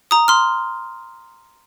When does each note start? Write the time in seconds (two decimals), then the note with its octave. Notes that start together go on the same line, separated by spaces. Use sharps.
0.11 A#5 D#6
0.28 C6 F6